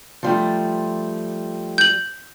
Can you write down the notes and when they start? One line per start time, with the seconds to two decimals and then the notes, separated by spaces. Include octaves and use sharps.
0.23 F3 G3 A3
1.78 G6 F#7